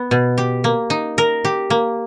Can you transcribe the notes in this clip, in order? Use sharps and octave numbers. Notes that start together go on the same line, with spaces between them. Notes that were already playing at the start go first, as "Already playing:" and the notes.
Already playing: B3
B2
G4
A#3
D#4
A#4
G4
A#3